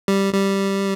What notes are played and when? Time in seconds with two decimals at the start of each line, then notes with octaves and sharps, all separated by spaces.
0.08 G3
0.34 G3